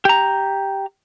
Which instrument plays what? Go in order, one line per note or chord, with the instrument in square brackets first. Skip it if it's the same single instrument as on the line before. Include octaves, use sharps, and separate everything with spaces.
[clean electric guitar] G4 A#5